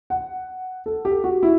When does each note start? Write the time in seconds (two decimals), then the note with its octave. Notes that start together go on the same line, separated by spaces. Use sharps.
0.10 F#5
0.86 A4
1.05 G4
1.24 F#4
1.43 E4